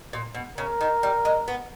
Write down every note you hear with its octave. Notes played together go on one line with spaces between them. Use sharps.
A#2
B2
C#3 A#4
D#3
G3
G#3
B3